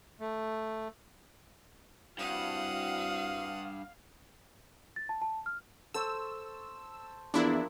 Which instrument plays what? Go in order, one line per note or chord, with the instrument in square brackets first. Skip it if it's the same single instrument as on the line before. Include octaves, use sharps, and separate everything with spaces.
[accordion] A3
[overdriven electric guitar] G2 [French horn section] C4 E4 F#4 [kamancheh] F5 [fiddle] F#5 D#6
[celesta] A6
A5
A5
F6
[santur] A4 C5 C#6 [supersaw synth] E6
[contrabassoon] E2 [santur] F3 A#3 [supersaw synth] D4 E4